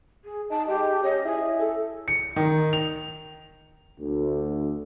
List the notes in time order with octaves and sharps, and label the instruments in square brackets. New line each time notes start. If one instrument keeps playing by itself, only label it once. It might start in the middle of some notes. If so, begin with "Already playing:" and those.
[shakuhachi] G#4
[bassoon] D#4 [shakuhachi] A5
[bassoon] G#3 [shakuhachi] G4
[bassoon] C#4 [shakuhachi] D#5
[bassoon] E4 [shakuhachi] G#4
[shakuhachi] A4
[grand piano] C#7
D#3
F7
[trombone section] D2